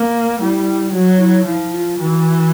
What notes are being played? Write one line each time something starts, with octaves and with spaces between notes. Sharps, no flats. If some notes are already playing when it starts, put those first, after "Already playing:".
Already playing: A#3
G3 E4
F#3 F#4
E4
F3 E4
F4
E3 F#4